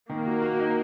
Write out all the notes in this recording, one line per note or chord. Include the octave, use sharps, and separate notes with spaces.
D#3 A#3
F#4
F#4
D#4